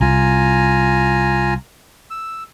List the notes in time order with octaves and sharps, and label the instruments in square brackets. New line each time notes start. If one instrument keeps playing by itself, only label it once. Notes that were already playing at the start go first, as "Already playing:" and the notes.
[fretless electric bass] C2 [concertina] F4 G#5 A#5
[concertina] E6